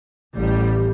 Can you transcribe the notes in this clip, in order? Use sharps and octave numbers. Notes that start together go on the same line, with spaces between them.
A1 A2 G3